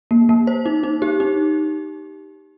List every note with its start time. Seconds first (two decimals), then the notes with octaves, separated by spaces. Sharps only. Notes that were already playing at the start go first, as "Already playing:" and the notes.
0.11 A#3
0.29 A#3
0.47 C5
0.66 D#4
0.84 D#4
1.02 G4
1.20 D#4